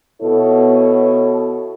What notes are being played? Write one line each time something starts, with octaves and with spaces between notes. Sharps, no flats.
B2 E4 A4 C#5